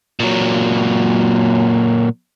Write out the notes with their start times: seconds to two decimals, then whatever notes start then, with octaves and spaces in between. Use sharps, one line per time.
0.20 A#2 F#3